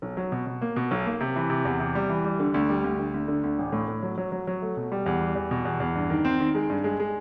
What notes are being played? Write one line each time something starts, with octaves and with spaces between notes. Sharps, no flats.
B1
F#3
B2
B2
A#3
B2
B1
A#3
C3
E3
C3
E2
C3
G3
E3
G3
D3
D2
G3
D2
D3
D2
D3
D2
A1
A2
A2
F#3
F#3
F#3
F#3
A3
B2
G3
E2
G3
E2
B2
E2
E2
G2
D#3
C4
D#3
G#3
G2
G#3
G#3